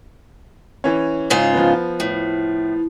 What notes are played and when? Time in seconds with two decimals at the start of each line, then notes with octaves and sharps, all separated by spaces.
0.84 E3 C#4
1.30 G#2 C#3 F4
1.54 F3 B3
2.00 A2